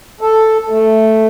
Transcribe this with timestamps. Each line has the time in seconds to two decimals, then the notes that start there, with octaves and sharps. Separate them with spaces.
0.21 A4
0.70 A3